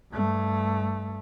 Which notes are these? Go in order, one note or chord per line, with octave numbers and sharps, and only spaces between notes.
G2 A3